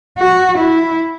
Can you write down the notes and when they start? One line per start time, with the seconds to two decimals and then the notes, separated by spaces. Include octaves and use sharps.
0.19 F#4
0.58 E4